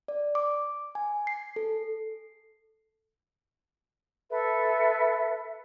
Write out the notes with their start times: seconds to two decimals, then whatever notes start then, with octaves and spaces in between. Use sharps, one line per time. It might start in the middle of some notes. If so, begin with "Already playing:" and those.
0.08 D5
0.35 D6
0.95 G#5
1.27 C7
1.56 A4
4.30 A4 B4 E5